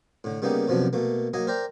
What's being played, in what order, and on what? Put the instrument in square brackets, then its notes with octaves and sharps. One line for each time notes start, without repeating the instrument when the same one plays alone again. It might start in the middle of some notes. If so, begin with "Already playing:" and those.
[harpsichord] A2 D3
C#3 G3 A#3 B3 D#4 G4
F#2 C3 F3 F#3 B3 D4
B2 A3 A#3
F#3 A#3 D#5 G#5
A#4 C5 D5 G5 A#5